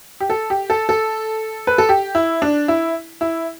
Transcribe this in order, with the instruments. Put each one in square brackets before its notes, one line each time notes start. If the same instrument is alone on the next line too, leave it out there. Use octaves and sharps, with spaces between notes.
[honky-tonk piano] G4
A4
G4
A4
A4
B4
A4
G4
E4
D4
E4
E4